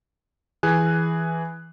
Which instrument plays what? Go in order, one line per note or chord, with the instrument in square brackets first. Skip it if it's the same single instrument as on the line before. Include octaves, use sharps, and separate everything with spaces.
[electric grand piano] E3 G#4 G#5 F#6